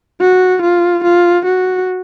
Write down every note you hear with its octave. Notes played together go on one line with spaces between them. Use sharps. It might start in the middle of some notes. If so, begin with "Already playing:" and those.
F#4
F4
F4
F#4